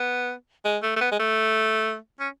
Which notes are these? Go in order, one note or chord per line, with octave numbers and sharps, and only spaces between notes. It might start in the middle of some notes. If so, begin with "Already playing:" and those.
Already playing: B3
G#3
A3
A3
B3
G#3
A3
C#4